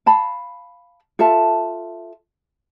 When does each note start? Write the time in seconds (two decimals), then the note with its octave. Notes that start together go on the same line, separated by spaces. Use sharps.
0.06 F5 A5 B5
1.19 F4 A4 E5 A5